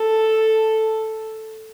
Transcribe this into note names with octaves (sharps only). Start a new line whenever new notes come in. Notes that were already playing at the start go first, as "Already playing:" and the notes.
Already playing: A4